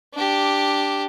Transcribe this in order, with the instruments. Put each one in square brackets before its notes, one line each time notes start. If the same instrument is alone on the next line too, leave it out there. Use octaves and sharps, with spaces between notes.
[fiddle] D4 G4